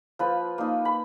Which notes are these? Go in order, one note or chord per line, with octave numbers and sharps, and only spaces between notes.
F3 B4 B5
A#3 D#4
B5